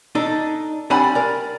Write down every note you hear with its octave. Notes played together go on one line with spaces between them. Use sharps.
D4 D#4 A4
G3 C4 D4 F#5 G#5 B5
A#4 D5